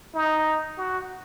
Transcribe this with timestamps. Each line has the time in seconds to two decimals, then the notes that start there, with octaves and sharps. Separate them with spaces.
0.15 D#4
0.77 F#4